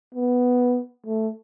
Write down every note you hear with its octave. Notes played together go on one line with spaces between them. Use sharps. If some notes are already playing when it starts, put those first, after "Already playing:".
B3
A3